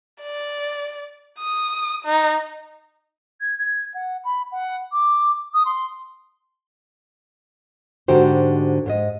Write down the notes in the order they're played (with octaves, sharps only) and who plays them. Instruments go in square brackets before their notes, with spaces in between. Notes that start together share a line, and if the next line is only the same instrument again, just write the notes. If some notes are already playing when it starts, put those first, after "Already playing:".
[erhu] D5
D#6
D#4
[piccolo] G#6
G#6
F#5
B5
F#5
D6
D#6
C6
[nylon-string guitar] G#2 D3 F#4 G4 C5
G#2 C5 D#5